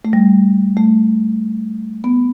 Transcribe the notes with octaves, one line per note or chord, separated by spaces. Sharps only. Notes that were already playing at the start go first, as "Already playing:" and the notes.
A3
G3
A3
B3